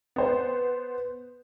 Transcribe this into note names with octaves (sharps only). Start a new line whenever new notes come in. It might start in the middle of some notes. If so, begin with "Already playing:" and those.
B3 C5